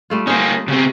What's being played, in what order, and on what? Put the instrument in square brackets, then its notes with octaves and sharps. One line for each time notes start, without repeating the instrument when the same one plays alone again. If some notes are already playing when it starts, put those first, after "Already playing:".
[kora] G3 A3 F4
[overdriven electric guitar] A#3 C#4 [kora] D#4 C5
[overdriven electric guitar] C#3 C4 [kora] F#4 G4